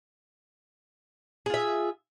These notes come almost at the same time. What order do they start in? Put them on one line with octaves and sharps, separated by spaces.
G#4 F4 E5